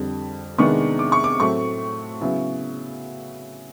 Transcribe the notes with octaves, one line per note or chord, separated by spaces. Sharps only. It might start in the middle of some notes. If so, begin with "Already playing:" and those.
Already playing: F2 D3 G3
C3 D#3 G#3 B3 D4 C#6
D6
C#6
D6
A2 F#3 A3 C4 C#6
C#3 F#3 B3 E4